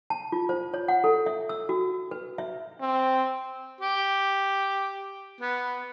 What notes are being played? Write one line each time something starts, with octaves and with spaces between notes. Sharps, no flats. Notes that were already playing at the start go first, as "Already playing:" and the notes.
A5
F4
C5
C#5
F#5
A4
E5
E6
F#4
B4
E5
C4
G4
B3